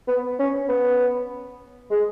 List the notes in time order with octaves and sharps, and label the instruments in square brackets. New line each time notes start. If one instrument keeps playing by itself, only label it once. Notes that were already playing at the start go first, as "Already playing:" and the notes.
[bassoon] B3
C#4
B3
G#3